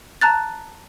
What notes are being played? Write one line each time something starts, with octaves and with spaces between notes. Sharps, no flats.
A5 A#5 F#6 A6